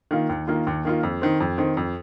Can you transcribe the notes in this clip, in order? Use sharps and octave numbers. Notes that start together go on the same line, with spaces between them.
D#3 A#3 F4
D#2
D#3 A#3 F4
D#2
D#3 A#3 F4
F2
D#3 C4
F2
D#3 C4
F2